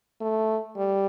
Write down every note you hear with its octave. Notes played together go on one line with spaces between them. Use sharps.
A3
G3